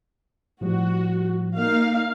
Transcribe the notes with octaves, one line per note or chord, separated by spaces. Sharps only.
A2 F3 G3 F#4
A#3 D#4 F5